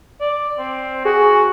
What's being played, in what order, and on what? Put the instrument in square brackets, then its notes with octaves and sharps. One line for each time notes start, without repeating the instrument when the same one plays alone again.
[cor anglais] D5
C4
[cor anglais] F#4 [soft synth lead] G#4